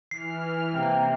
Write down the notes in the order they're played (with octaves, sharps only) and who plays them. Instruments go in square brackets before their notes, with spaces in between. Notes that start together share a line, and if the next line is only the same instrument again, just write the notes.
[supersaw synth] E3 F6 [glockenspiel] C7
[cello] C3 A#3 [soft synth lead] G5